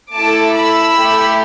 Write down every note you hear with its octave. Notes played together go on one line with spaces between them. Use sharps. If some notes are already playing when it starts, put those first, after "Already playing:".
A3 E4 A4 A5 D6
B5 E6
A3 E4 G4